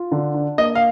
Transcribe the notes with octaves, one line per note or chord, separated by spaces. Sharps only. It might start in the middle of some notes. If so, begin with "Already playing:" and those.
Already playing: F4
D3
D4
A#3 D#5
F5